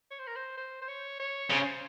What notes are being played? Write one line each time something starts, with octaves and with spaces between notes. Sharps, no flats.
C#5
C5
A#4
C5
C5
C5
C#5
C#5
C#3 C5